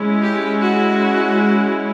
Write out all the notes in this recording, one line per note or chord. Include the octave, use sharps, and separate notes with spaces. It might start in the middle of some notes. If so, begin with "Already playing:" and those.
Already playing: G#3 C#4 E4
G4
F#4